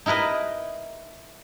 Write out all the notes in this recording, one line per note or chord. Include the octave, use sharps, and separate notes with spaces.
D#4 E4 A#4 B4 D#5